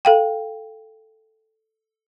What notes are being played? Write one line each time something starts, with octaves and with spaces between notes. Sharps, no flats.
A4 F5 G5